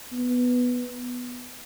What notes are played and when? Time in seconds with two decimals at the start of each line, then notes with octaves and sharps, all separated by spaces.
0.12 B3